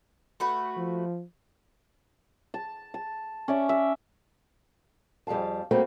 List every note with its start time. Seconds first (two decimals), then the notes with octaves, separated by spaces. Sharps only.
0.40 A3 F#4 B4
0.77 F3
2.54 A5
2.94 A5
3.48 C#4 D5 E5
3.69 E5
5.27 F2 G3 G#4 F5 A5
5.71 G3 A3 A#3 C4 F#4